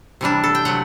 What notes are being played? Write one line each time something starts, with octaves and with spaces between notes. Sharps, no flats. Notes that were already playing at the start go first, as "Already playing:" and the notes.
C3 E3 G3 D4
A4
G5
C3 F#3 A3 F#5